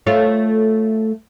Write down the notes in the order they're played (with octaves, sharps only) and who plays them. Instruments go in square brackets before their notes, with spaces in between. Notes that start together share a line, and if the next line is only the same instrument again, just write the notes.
[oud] A3 F4 C#5